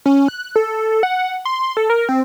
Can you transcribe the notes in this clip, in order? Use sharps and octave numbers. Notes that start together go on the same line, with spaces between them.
C#4
F#6
A4
F#5
C6
A4
A#4
C4